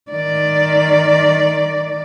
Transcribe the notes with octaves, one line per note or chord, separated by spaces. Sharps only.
D#3 D5